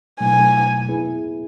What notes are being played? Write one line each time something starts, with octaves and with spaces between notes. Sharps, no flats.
B2 F#3 A3 E4 G#5
B3 E4 G#4 B4